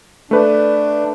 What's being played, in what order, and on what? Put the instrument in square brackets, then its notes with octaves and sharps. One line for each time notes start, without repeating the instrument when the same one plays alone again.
[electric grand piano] A3 B4 [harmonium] D4